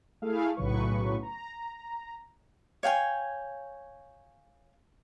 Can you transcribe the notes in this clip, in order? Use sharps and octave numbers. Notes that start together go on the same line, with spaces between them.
A3 E4 G#4 F5
B1 A2 C#3 F#3 B4 C#6
A#5
C#5 F5 G5 G#5